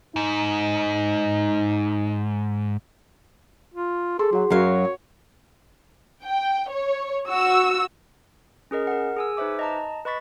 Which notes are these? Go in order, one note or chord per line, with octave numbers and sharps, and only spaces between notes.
G#2 D#4
F4
G#4 A4 C6
F#3 F#4 F#5
F#2 F#3 C#5 F5
G5
C#5
F#4 E6
C#4 G#4 A#4 D#5
A#4 F#5
G#4 G#5 E6
D#4 B4 C5 E5 D6
D#5 A5 A#5
B4 D#5 B5 C#6 A6 B6